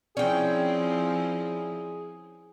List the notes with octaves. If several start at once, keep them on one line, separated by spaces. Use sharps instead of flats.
F3 C4 C#4 E4 G#4 D5 G5